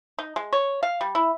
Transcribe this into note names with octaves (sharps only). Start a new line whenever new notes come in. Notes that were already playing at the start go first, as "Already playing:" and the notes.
D#4
G#3
C#5
F5
G3
E4